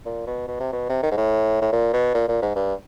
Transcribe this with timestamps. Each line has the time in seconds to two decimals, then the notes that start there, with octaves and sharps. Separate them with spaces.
0.06 A#2
0.27 B2
0.47 B2
0.60 C3
0.72 B2
0.89 C3
1.03 D#3
1.11 G#2
1.17 A2
1.62 A2
1.72 A#2
1.93 B2
2.14 A#2
2.28 A#2
2.42 G#2
2.56 G2